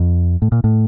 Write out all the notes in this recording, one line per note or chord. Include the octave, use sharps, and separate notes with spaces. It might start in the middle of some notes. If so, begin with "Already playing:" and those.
Already playing: F2
A2
A#2
A2